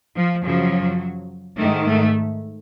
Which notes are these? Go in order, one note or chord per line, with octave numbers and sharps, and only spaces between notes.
F3
F#2 C#3 F3 F#3
G#2 D#3 A3
A3